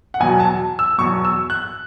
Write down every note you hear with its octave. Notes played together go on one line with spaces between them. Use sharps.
F#5
E2 B2 F#3 G#5
A5
E6
E2 B2 F#3 C#6
E6
F#6